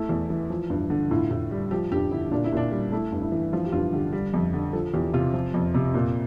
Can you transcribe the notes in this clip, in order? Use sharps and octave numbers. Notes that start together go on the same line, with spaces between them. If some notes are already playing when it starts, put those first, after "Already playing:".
Already playing: A3 E4
E2
E3
F3
G2
D3
A2 F4
A2
G3
F3 G4
G2 G4
D3 E4
A#2 D4
E4
A#2 D4
G3
A3 E4
G2
E4
E3
F3 F4
G4
G2 F4
D3 G4
G3
F2
D3
F3 A4
E2 G4
C3 F4
F3
F2
C3
A#2